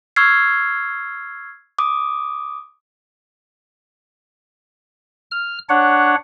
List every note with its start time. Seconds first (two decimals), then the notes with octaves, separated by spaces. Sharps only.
0.16 C#6 E6 F6 G#6 C7
1.79 D6 D#6
5.31 F6
5.69 D4 C#5 F#5